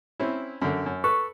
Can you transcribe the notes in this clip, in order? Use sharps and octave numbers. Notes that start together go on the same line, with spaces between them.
C4 C#4 E4
F#2 D3
F#2
A4 B4 C#6